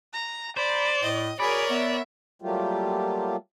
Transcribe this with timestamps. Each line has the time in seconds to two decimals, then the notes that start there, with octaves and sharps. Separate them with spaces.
0.13 A#5
0.57 C5 D5 A#5 B5
1.03 A2 D#5
1.40 F#4 G#4 A#4 C#5 D5 G#5 B5
1.70 B3 E5
2.42 F#3 G3 A3 A#3 F4 G4